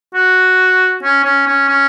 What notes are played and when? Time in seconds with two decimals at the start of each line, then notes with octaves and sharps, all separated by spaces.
0.14 F#4
1.03 C#4
1.24 C#4
1.47 C#4
1.69 C#4